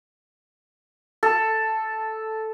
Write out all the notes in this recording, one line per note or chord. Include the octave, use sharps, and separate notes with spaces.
A4